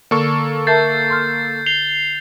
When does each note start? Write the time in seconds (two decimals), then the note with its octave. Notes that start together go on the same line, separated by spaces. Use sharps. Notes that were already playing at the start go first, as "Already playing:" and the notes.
0.11 D3 A#3 A4 C#6
0.67 A#4 E5 A5 G6 A6 C7
1.10 C6 F6
1.66 C7 F7 G7